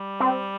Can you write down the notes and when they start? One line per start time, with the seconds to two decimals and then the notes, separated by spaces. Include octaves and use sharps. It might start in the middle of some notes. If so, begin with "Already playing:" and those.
Already playing: G3
0.20 C4